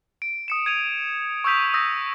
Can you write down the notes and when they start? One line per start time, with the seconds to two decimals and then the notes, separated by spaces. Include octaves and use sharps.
0.22 D7
0.48 D#6 C#7 E7
0.66 G#6 D#7 F7
1.44 C#6 D#6 E6 G6 B6 F7
1.74 D#6 E6 G6 A#6 D#7